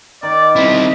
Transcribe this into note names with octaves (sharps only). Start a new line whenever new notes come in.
D#3 D5
C4 E4 C5 B5